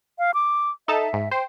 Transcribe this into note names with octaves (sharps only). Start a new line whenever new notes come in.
F5
D6
D#4 A4 E5 A5
G#2
C5 G5